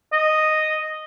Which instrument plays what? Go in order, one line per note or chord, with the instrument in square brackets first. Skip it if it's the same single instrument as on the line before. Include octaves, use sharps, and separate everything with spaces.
[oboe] D#5